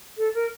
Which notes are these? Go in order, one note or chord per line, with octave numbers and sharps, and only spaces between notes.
A4
A#4